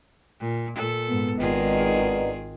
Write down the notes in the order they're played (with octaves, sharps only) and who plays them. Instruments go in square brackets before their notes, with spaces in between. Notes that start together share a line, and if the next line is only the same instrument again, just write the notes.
[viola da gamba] A#2
A#2 A4
[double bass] G#2 B3
[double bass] G#1 G#2 [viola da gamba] D#3 F4 G#4 [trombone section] B3 D4 D#4